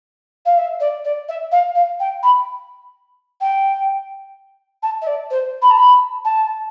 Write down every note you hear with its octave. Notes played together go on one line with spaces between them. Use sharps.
F5
E5
D5
D5
E5
F5
F5
G5
B5
G5
A5
E5
D5
C5
B5
A5
B5
A5